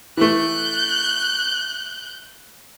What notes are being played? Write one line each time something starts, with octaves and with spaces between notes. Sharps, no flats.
E3 A3 F#6 G6